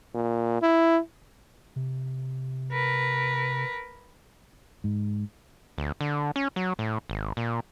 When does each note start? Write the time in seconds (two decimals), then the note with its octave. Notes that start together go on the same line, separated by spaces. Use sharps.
0.14 A#2
0.62 E4
1.76 C3
2.72 A#4 B4
4.84 G#2
5.78 D2
6.01 D3
6.36 C#4
6.56 F#3
6.79 A2
7.10 G#1
7.37 A#2